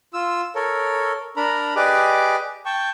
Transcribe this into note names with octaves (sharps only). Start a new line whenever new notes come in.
F4 E6
A4 A#4 C#5
D4 A#4 A#5 B5
G4 G#4 B4 D5 D#5 D6
G5 A5 C#6